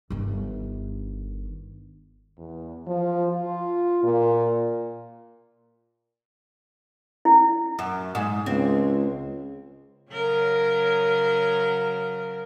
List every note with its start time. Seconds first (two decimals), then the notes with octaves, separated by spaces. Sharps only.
0.10 G1 D#3
2.37 E2
2.87 F3
3.29 F4
4.03 A#2
7.25 E4
7.79 F#2
8.15 G#2
8.46 C#2 C4
10.11 C#3 F#3 A#4